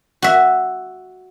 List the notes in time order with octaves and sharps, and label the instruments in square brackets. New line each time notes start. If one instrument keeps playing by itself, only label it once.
[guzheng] F#4 E5